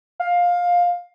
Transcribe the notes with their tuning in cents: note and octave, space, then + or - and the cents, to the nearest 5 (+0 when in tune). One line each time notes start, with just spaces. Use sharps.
F5 +15